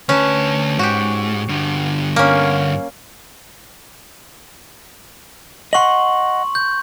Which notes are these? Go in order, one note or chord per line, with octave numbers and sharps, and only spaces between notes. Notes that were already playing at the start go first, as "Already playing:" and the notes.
D2 C#4 B4 A5
G#2 F#4 G4
G2 D3
A#3 C#4
D#5 F#5 C6 C#6 F#7
G6